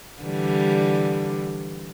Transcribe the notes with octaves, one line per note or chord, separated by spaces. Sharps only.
D3 E3 G3